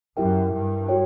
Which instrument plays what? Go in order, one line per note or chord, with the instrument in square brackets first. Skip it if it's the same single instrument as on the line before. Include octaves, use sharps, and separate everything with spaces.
[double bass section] F#2 [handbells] E4 G4 A#4 E5 G5
[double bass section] G2
[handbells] F#4 C#5 G5